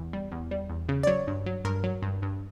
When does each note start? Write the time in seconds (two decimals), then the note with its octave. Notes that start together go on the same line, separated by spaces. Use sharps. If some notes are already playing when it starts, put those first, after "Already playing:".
Already playing: E2
0.13 G3
0.32 E2
0.51 G3
0.70 E2
0.89 C#3
1.03 D5
1.07 F#3 C#5
1.27 G2
1.46 F#3
1.65 G2 A#4
1.84 F#3
2.02 G2
2.22 G2